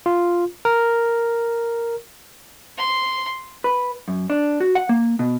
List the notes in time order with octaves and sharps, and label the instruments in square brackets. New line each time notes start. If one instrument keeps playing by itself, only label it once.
[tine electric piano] F4
A#4
[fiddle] C6
[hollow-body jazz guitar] B4
F#2
D4
F#4
F#5
A#3
B2